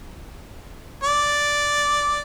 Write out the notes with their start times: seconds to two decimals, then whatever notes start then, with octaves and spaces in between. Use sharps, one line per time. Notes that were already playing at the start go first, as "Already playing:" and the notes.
1.04 D5